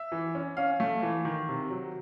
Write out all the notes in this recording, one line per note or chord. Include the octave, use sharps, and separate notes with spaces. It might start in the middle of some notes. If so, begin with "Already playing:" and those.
Already playing: E5
E3
C#4
C#4 F5
A3
E3
D#3
C3
F#3